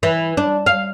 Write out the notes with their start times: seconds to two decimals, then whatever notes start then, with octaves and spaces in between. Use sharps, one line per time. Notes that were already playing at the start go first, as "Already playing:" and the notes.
0.03 E3
0.37 D4
0.66 F5